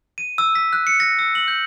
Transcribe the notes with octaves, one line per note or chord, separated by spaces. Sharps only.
D#7
E6
B6
F#6
C#7
A#6
E6
F#7
G6